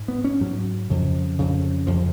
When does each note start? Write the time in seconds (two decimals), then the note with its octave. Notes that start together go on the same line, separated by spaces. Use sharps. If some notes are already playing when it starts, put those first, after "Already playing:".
Already playing: G#2
0.08 B3
0.24 C#4
0.40 G#2 F#3
0.90 F2 C#3
1.39 F2 C#3
1.87 F2 C#3 F3